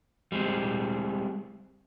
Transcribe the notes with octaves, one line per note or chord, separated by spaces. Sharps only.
G3 G#3 C4